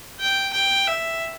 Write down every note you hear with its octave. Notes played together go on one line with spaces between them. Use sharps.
G5
G5
E5